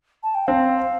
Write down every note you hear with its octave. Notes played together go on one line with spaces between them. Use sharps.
A5
G5
C4 F5